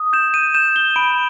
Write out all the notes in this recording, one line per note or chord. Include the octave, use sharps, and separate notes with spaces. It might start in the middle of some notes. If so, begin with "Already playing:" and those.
Already playing: D#6
G6 E7
D#7
G6 E7
G7
B5 D7